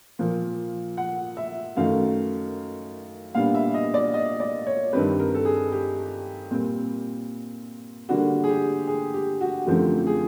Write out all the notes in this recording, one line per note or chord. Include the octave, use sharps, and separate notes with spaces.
A#2 F3 A#3
F#5
E5
F#2 D#3 F#3 A3 F5
A#2 G3 B3 D4 F5
E5
D#5
D5
D#5
D5
C#5
G2 D#3 G3 C4 B4
A#4
A4
G#4
G4
A#2 G3 C4
D3 G3 A#3 D4 F#4
G#4
G4
G#4
G4
F#4
F#2 D3 F3 A3 C4 G4
G#4